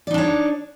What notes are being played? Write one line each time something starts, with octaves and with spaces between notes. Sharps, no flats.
D4 D#4 C#5 D5